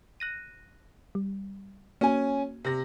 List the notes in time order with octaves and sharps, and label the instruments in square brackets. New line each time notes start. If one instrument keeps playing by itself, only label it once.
[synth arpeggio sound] F#6 A#6 D#7
G3
[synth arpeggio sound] A#3 F#4 [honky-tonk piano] C#4 G#5
[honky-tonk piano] C3 A#6